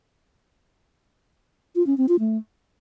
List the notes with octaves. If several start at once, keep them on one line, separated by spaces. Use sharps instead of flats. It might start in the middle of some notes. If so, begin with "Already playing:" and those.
F4
C#4
C4
F4
A3